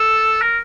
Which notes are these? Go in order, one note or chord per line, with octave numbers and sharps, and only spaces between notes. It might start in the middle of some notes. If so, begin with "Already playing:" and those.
Already playing: A4
A#4